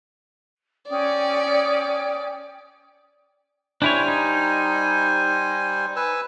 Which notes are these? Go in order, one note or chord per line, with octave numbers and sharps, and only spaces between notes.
C#4 D5 G5 D#6
G3 D4 E4 C5 C#5 G#5
D#4
B4 G#5 E6